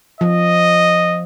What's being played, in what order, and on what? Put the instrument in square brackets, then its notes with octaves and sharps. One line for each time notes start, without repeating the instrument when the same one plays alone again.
[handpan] F3 [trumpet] D#5